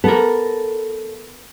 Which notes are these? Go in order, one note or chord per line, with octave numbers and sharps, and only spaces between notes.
B3 A4 A#4